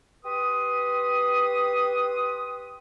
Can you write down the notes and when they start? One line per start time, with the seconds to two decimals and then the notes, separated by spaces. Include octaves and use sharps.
0.24 G4 B4 C6 D#6